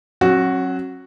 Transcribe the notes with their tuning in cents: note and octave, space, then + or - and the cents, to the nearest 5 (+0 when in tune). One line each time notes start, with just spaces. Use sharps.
F#3 +0 C#4 -40 F#4 +0